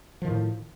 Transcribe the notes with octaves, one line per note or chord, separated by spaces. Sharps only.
A2 D#3 F3